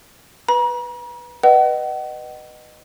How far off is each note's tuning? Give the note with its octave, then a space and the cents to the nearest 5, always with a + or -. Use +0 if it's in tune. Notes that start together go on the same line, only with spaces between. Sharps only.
B4 +0 A#5 +45
B4 +0 D#5 -20 F#5 +35